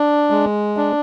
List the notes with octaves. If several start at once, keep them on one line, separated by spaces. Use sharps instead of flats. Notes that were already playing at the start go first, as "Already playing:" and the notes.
Already playing: D4
G#3
D4